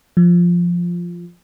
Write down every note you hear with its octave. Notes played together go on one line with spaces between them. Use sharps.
F3